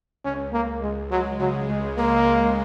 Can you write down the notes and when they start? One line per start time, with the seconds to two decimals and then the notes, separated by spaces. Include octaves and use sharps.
0.25 C#2 C#4
0.53 C#2 A#3
0.82 C#2 G#3
1.11 F#3 G#3
1.40 C#3 F#3
1.69 C#2 G#3
1.98 G#3 A#3
2.27 C#2